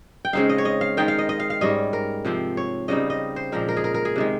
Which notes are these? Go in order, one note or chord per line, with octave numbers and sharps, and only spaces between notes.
G5
C#3 G#3 C4 D#4 F5
D#5
C#5
D#5
F5
D#3 G#3 D#4 G5
F5
D#5
D#5
F5
F5
G#2 G3 C#4 D#5
A#4
C3 F3 C4
C#5
C#3 G3 C4 D#4 D#5
D#5
C5
A#2 F3 G#3 A#4
A#4
G#4
A#4
A#4
G#4
C3 D#3 G#3